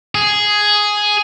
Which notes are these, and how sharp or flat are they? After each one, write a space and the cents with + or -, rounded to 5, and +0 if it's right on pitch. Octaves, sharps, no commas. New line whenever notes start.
G#4 +5